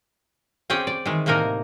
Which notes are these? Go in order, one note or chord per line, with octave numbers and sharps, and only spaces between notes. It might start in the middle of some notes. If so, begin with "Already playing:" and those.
C4 C#4 G#4 D5 G5
D5
D#3 E3 G#3
A2 C3 A#3 D#4 A#4